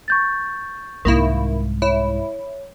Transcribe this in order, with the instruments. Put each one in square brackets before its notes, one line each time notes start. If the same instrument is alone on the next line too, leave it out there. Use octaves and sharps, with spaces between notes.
[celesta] C#6 G6 A6
[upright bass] C2 G#2 [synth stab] D#3 A#3 E4
[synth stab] E4 [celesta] C#5